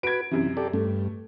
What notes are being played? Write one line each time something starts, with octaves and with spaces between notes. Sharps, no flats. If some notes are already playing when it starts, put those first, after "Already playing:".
F#4 B4 G#6 D7
F#2 C3 E3
G4 A4 D5
G2 A3